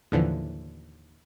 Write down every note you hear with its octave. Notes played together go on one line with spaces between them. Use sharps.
D#2 A2 D3 E3 F3